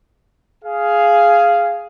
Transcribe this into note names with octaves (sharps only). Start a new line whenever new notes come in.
G#4 F5